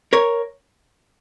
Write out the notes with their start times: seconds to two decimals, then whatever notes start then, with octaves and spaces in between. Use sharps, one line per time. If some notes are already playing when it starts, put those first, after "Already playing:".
0.13 A#4 C#5